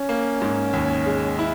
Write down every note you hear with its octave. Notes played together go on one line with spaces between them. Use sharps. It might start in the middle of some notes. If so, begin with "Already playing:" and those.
Already playing: C#4
A#3
G#2
D#2
G#3
E4